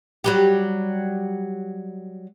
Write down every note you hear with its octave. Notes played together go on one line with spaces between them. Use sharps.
F#3 G3 G4